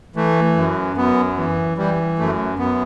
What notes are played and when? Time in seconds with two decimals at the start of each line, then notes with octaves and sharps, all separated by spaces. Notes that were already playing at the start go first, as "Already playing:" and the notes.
0.16 E3 A3
0.56 F#2
0.97 F#2 B3
1.38 E3
1.78 E3 G3
2.18 F#2 A3
2.59 F#2 B3